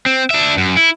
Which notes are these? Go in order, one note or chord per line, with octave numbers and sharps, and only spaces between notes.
C4
D4 E5
F#2
E4